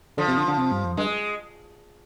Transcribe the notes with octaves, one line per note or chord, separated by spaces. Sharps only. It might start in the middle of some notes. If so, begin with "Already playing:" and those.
D3 F3
C3
D3
D3
C3
G2
F2
G2 G#3